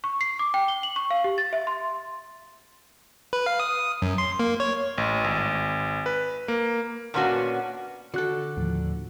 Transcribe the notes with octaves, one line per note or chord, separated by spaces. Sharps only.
C#6
C7
D6
G5
G7
F#7
C#6
F5
G4
A6
E5
C6
B4
F5
D#6
F#2
C6
A#3
C#5
A1
G#1
B4
A#3
A#2 A#3 B3 C#4 D4 F#4
D3 F#4 A4 F#6
D#2 A2 F3